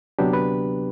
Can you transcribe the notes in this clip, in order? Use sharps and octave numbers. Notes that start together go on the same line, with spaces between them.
D2 C3 F#3 B3 D4 G4
B4